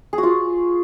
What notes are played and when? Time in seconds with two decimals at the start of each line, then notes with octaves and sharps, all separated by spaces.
0.13 G#4
0.18 F#4
0.23 F4